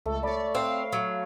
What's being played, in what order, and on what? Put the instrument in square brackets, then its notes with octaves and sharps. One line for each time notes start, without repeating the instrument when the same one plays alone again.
[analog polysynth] C#2 A4 [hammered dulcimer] A3
[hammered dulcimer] C#5 B5 [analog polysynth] D5
[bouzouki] C4 [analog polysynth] F5
[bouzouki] F#3